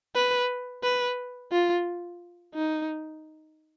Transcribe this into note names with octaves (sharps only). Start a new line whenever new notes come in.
B4
B4
F4
D#4